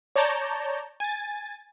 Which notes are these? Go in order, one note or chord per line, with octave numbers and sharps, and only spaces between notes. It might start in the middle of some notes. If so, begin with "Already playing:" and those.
C#5 D5 A5 A#5 G6
G#5 A6